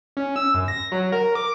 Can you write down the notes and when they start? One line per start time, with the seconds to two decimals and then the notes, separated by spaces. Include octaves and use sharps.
0.17 C#4
0.36 E6
0.54 F#2
0.68 A#6
0.92 F#3
1.12 A#4
1.35 D6